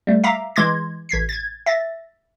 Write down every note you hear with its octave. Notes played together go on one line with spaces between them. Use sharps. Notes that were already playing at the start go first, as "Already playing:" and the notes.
G3 A3
E5 F5 A#5 D6
E3 G#3 C6 D6 G#6 A#6
A1 G#6 B6 C7
G#6 A6
E5 A6 A#6